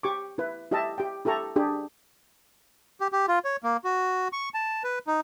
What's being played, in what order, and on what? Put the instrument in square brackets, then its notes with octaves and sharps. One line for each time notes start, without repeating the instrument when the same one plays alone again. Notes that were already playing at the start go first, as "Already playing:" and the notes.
[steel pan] G4 C#6 D6
E4 B4
E4 G4 D#5 E5 A5
G4 G5
E4 G4 A4 A#5 C#6
D4 G4 G#4
[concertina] G4
G4
F4
C#5
A#3
F#4
C#6
A5
B4
D#4